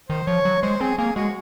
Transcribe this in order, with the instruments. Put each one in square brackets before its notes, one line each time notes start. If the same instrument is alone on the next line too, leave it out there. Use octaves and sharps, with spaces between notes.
[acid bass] D#3 [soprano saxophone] C5
[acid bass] F3 [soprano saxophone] C#5
[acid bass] F#3
[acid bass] G#3 [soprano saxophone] C5
[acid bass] C4 [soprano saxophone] G#4
[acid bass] A#3 [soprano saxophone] G#4
[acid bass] G#3 [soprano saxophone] F#4